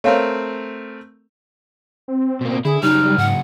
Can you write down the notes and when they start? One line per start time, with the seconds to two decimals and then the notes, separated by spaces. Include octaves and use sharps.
0.04 A3 C4 A#4 C#5 F5
2.08 C4
2.41 B2 A#3
2.65 D3 E4 G#4
2.83 C#3 F#3 G3 D#4 F6
3.18 G#2 F#5